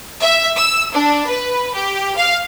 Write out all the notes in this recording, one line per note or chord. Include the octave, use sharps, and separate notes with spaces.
E5
E6
D4
B4
G4
F5